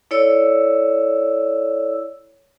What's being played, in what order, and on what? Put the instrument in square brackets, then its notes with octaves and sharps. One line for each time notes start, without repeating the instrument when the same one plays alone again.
[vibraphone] E4 A4 C#5 D5 E6